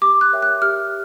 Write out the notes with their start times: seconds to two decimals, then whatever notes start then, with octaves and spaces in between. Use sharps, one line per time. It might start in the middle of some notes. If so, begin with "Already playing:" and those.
0.01 G4 D6
0.21 F#6
0.32 A#4 C#5 E5 G5
0.42 F#6
0.62 G4 F6